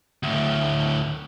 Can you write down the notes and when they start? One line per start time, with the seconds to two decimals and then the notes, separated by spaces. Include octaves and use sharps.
0.23 D2 A2